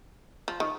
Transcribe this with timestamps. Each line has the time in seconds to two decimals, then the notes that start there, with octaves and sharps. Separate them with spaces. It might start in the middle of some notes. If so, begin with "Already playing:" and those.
0.48 F3
0.60 D#3